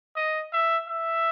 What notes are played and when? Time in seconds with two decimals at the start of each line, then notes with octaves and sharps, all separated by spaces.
0.16 D#5
0.53 E5
0.88 E5